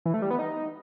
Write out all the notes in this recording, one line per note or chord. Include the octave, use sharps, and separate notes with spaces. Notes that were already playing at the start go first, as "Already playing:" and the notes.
E3
A3
G3
B3
D#4